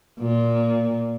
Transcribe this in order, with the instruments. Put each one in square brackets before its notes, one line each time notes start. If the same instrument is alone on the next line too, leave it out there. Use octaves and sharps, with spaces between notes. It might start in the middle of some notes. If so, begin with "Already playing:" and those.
[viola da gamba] A#2